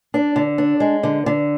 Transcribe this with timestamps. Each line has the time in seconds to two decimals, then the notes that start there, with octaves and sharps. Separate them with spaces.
0.14 D4
0.36 D3
0.58 D4
0.80 G#3
1.03 D3
1.26 D3